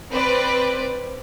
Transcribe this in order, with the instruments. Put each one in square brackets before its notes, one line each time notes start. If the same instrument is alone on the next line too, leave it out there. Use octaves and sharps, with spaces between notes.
[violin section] C4 B4 D5